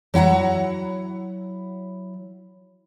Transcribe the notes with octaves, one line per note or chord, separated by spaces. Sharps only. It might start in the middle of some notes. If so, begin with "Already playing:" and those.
F#3 E4 F#5 A#5